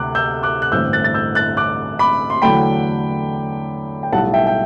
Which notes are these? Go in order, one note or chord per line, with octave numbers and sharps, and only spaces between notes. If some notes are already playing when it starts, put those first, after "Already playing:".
Already playing: D2 C3 D6 F#6
E6 G6
D6 F#6
F#6
A1 G2 D3 A3 C4 E6 G6
F#6 A6
A6
E6 G6
F#6 A6
D6 F#6
B5 D6
C6
E2 D3 F#3 A3 G5 B5
G5
B1 A2 G3 F#5 A5
E5 G5
G5